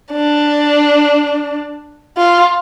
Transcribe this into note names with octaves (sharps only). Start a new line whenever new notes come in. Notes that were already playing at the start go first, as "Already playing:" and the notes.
D4
F4